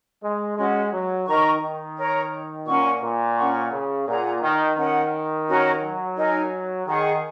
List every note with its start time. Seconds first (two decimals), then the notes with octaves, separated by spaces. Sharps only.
0.22 G#3
0.57 G#3 C#4 F#4 D#5
0.93 F#3
1.27 D#3 A#4 D#5 A#5 C#6
1.62 D#3
1.97 A#4 C#5 A#5
2.66 A#2 C#4 A#4 F#5 C#6
3.02 A#2
3.36 C#4 A#4 F#5 C#6
3.72 C#3
4.06 A#2 G#4 F#5 A#5
4.41 D#3
4.76 D#3 C#4 A#4 F#5
5.47 C#4 F#4 A#4 C#5
5.81 F#3
6.16 D#4 A#4 D#5 G#5
6.86 D#3 G#4 F#5 C#6